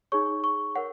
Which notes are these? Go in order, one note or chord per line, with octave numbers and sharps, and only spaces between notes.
D#4 G#4 C#5 C#6
C#6
A#4 C#5 F#5